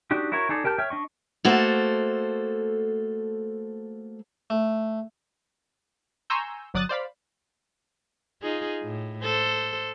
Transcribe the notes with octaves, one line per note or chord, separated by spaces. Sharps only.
D4 D#4 F#4 G4
E4 F#4 A#4 C#5
D#4 G#4 A4 D5
G4 A#4 G5 A5 G6
C#5 E5 G5 F6
D4 D#5 C#6
A3 A#3 F#4 A4 C5
A3
G#5 A#5 C6 C#6 E6 G6
G1 F#3 D5 D#6 F#6 A6
C5 D5 F5 B5
D#4 F4 G#4
A2
A4 C5